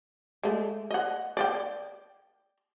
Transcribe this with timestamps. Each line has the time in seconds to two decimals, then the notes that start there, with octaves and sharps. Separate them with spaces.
0.43 G#3 A3
0.91 D#5 F#5
1.37 D5 D#5 G5